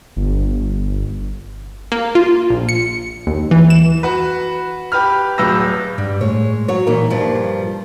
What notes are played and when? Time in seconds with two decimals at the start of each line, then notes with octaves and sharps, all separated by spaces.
0.16 G1
1.92 A#3
2.15 F4
2.50 A#1
2.69 C#7
3.27 D#2
3.51 E3
3.70 E7
4.03 F#4 B4
4.92 G4 B4 B5 F6
5.38 D1 F#3 B4 E6 A#6
5.98 G2 G3
6.21 A2 G#3 C#5
6.68 F#3 C#5
6.87 A#2 E3 D#4 A#4
7.10 G2 F3